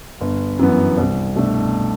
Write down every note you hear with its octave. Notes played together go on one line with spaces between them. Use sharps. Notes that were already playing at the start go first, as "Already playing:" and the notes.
G1
F#2 E3 B3
C2
B2 A3 D4